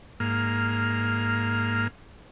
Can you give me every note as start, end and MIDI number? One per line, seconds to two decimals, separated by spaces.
0.20 1.88 44
0.20 1.88 58
0.20 1.88 89